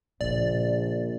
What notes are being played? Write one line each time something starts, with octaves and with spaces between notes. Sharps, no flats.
A#1 A#2 C#3 D5